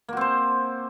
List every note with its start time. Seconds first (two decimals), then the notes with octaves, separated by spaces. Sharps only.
0.08 A#3
0.13 F#4
0.17 C4
0.21 C5